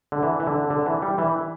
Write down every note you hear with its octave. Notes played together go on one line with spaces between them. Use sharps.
D3
E3
E3
D3
D3
E3
G3
E3